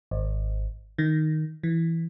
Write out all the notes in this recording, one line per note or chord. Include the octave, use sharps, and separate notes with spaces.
G#1
D#3
E3